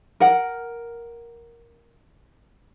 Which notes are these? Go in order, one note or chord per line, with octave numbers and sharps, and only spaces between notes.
A#4 F#5